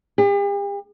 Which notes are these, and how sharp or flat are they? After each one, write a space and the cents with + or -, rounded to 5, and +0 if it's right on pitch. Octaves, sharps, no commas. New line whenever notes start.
G4 +45